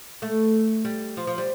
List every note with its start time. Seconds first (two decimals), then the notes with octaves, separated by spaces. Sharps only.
0.22 A3
0.85 G3
1.17 F3
1.27 F3
1.38 G3